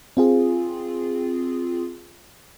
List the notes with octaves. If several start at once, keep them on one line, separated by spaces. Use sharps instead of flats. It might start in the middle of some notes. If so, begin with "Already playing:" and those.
C4 F4 G#4